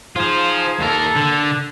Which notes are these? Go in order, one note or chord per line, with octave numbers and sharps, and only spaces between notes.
F3 D#4 F4 G#4 C5
D#2 A#3 A4 A#4
D3